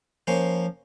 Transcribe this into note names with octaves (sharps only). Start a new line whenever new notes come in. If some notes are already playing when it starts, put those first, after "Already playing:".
F3 A#3 C#4 C5